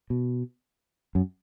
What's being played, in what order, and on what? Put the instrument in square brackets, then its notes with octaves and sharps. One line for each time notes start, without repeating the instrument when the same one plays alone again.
[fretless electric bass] B2
F#2